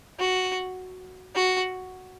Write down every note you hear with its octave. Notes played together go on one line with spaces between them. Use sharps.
F#4
F#4